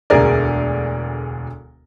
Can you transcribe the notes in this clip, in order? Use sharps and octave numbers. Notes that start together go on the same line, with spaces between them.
E1 D2 G#4 A#4 D5